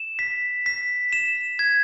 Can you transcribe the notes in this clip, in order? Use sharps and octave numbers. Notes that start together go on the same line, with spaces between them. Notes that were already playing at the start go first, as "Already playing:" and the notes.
Already playing: E7
B6
B6
E7
G#6